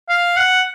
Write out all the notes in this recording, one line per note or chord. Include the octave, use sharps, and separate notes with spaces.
F5
F#5